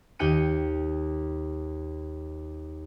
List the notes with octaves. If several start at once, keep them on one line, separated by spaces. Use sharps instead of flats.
D#2 D#4 G5 F#6 C#7 D#7